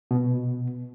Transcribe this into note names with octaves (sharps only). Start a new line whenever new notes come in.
B2